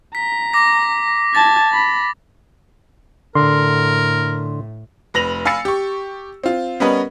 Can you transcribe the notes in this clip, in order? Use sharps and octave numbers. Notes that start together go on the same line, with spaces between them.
A#5 B6
D6 A#6
A5 G#6 A6
B5
A2 D3 A#4 C6
F1 B4 A#6 F7 F#7
F5 G#5 B5 E6 A6 C#7
G4 C#6
C4 F4
G3 B3 C#4 A#4 B4 D#5